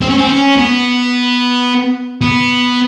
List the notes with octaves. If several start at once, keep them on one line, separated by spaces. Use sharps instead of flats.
C4
C#4
C4
C#4
B3
B3